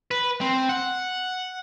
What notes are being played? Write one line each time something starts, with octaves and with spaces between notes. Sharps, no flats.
B4
C4
F#5